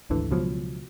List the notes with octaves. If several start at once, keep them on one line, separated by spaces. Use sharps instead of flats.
G#1 D2 D3 E3
C#2 B2 F3 F#3